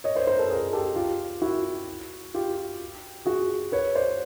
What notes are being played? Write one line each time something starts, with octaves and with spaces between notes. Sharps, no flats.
C#5 D#5
C5 D5
A#4 C5
A4 B4
G#4 A#4
G4 A4
F4 G4
E4 F#4
F4 G4
F#4 G#4
B4 C#5
C5 D5